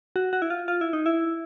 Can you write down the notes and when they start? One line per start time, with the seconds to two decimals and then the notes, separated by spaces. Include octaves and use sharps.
0.16 F#4
0.33 F#4
0.42 E4
0.50 F4
0.68 F4
0.81 E4
0.93 D#4
1.06 E4